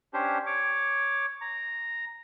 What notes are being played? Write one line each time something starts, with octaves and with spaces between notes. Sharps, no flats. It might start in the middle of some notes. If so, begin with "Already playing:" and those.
C#4 D4 G4 C5
C#5 D6
A#5